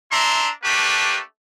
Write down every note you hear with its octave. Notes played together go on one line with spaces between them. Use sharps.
D4 E4 E5 A#5 C6
A3 A#3 D4 G4 B4